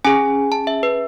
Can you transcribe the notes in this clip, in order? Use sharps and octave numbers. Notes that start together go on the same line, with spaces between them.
C#4 G#4 G#5
A5
E5
B4